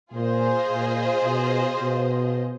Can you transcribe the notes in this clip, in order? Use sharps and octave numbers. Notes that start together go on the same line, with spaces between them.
A#2 F4 G#4 C5 D#5
A#2
B2
B2